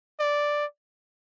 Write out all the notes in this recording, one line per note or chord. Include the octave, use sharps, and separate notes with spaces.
D5